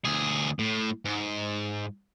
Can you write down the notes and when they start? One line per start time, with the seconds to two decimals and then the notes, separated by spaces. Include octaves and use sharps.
0.05 D2 G#4
0.59 A2
1.05 G#2